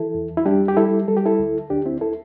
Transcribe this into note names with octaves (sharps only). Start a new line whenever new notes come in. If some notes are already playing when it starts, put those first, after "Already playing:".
Already playing: E3 E4 A4
E2
E4
G3 D4 G4
G4
G3 E4 A4
G3 A4
G4
E4 A4
D2
D2 D4 G4
C4 E4
E4 A4